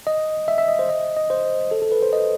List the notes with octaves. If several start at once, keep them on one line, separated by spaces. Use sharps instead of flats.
D#5
E5
E5
D#5
C5
D#5
D#5
C5
A4
A4
B4
C5
D#5